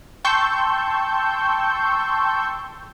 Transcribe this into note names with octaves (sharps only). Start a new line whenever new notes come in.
G5 A5 C6 C#6 E6 G6